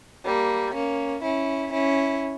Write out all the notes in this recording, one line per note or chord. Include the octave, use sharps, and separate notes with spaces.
G3 A#3
A#3 C#4
C#4 E4
C#4 E4